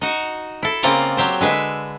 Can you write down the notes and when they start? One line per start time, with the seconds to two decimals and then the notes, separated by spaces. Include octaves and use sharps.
0.01 D#4 F#4
0.63 E4 A4
0.83 C#3 A#3 C4 F4 D5 A#5
1.17 F#3 G4 C5
1.40 D3 G#3 B4 E5